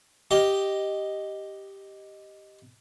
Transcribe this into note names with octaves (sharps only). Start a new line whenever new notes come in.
G4 D#5